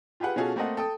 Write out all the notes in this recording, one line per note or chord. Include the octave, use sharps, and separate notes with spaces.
F4 G4 G#4 B4 F#5
B2 C#4 F4 F#4 G#4 A4
A3 A#3 C4 A4 D#5 F#5
A4 G5 D#6